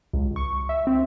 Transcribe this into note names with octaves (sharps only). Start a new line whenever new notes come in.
C#2
C#6
E5
C4